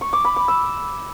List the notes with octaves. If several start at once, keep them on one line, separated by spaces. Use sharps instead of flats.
C#6
D6
B5
D6
E6